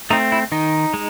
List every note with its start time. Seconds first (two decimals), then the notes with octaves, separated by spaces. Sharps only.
0.10 A3 C4 D#4
0.32 E4
0.52 D#3 D#4
0.94 G#3